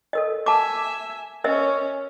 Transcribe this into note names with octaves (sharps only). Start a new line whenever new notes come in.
A4 A#4 D#5
E5 G#5 A5 D6
C#4 A#4 D#5 E5